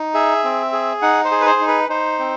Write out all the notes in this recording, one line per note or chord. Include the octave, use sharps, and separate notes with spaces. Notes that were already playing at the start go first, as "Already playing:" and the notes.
Already playing: D#4
G#4 E5
C4
G#4
D#4 F#5
C5
G#4
B4
C5
D#4
B4
D#4 C5
C4